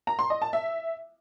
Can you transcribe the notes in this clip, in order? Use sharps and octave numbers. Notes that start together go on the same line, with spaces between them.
A#5
C6
D#5
A5
E5